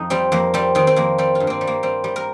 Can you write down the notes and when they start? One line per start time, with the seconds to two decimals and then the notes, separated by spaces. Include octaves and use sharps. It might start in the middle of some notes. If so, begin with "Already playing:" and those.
Already playing: F2 D#4
0.10 G3 C4
0.32 F2 A#3
0.54 G3 C4
0.75 D#3 C4
0.87 C4
0.96 F2 A#3
1.18 G3 C4
1.35 F4
1.40 G2
1.47 A#3 C4
1.61 G3
1.67 A#3
1.83 G3 C4
2.04 G3
2.16 A#4